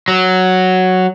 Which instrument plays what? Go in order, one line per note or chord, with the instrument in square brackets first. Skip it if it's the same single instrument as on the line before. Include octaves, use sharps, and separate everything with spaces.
[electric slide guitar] F#3